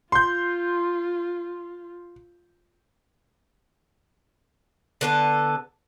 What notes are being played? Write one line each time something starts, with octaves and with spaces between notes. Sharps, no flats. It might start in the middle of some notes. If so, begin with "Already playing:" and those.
F4 C6 G6
D3 B3 A4